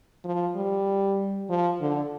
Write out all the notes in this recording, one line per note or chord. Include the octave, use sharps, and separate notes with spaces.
F3
G3
F3
D3